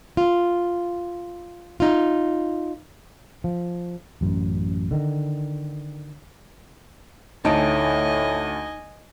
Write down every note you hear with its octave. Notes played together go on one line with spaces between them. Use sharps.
F4
D#4 F4
F3
A1 F#2
D3 D#3
D2 A2 D#4 D#5 G#5 A5 D7